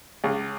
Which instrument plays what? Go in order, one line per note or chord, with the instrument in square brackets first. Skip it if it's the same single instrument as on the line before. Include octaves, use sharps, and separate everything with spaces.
[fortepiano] C#2